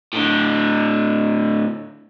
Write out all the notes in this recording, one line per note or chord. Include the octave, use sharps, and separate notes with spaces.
A2 D3